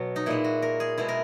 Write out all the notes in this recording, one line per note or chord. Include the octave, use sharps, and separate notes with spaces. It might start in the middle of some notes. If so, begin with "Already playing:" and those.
Already playing: B2 F#3
D#4
A#2 G#3 E4
F#4
A#4
G#4
B2 G#3 E4
A#4